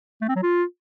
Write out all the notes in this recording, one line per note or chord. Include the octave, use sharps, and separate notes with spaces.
A3
C4
F#3
F4